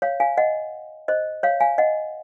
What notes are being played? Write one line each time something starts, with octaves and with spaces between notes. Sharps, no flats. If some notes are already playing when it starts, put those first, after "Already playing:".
C#5 F5
F5 G#5
D#5 F#5
C5 D#5
C#5 F5
F5 G#5
D#5 F#5